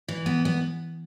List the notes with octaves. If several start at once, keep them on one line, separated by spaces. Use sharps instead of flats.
E3
B3
B3